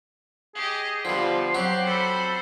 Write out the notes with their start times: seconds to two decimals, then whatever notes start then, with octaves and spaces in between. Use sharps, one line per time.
0.55 G4 G#4 D#5
1.05 D3 F3 G3 B3 C6
1.54 F#3 C4 F#4 G4
1.86 A4 C5 B5